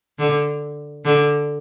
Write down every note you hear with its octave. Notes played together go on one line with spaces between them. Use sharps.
D3
D3